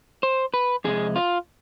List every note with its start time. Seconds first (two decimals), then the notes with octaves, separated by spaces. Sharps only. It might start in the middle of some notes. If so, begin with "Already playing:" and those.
0.23 C5
0.54 B4
0.84 F2 C3 G#3 G#4
1.16 F4